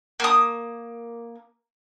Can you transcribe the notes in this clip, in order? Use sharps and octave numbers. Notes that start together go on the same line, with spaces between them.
A#3 D#6